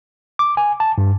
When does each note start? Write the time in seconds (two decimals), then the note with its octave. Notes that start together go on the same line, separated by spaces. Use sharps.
0.39 D6
0.57 G#5
0.80 A5
0.98 G2